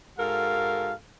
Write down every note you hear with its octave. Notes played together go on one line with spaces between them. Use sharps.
G#2 F#4 A4 A#4 F5